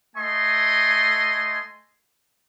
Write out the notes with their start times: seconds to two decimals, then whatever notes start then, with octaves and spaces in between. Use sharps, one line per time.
0.16 A3 D#5 G#5 C6